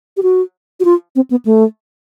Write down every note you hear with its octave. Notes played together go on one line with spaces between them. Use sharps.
G4
F#4
F#4
F4
C4
B3
A3